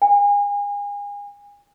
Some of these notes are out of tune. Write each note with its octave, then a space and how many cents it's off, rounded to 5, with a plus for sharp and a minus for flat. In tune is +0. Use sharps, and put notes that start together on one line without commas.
G#5 -35